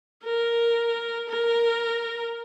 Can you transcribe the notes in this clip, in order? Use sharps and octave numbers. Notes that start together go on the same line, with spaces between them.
A#4
A#4